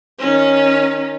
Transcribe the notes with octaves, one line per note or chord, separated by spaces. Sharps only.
D#3 C#4